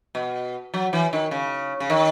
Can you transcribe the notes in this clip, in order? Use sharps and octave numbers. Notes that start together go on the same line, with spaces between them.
B2
F#3
E3
D#3
C#3
C#3
D#3